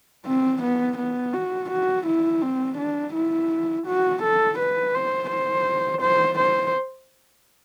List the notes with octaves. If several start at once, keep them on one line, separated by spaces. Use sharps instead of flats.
C4
B3
B3
F#4
F#4
E4
C4
D4
E4
F#4
A4
B4
C5
C5
C5
C5